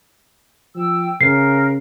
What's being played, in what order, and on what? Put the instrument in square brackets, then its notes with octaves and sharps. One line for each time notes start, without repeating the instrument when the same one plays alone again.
[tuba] F3 [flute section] G5 E6
[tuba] C#3 [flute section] A#4 [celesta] C7